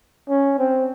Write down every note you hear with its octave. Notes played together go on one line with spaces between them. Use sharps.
C#4
C4